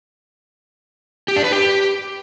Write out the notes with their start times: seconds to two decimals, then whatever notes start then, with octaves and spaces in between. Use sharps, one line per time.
1.28 G4
1.36 D4
1.44 B4
1.52 G4